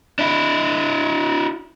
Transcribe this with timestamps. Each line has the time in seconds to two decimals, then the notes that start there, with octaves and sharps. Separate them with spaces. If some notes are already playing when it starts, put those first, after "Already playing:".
0.19 D4 E4